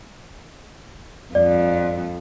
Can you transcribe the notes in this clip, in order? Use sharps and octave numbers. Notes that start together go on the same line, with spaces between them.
F2 D5